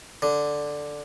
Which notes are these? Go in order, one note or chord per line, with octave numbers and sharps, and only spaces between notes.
D3